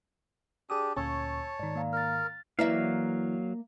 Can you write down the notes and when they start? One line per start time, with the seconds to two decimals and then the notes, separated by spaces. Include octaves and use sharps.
0.70 D4 G4 G#4 D#6
0.96 D2 A#2 C#4 C#5 G#5 A5 C#6 E6
1.59 G#2 D#3 D5
1.76 A#3 F5 A#5
1.93 A#4 F6 A6
2.59 E3 F#3 A#3 D5 E5 F5